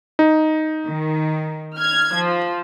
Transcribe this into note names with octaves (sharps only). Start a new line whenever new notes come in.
D#4
D#3
F6 G#6
F3